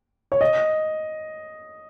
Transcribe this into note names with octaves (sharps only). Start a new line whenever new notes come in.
C#5
D#5